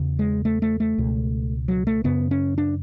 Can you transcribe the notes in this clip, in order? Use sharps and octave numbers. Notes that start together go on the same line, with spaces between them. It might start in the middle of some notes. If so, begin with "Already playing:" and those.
Already playing: E2 C#3
G#3
A3
A3
A3
C#2 B2
F#3
A3
F#2 C#3 B3
C#4
D4